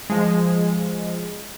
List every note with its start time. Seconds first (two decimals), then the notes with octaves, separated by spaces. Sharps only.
0.10 F3 G#3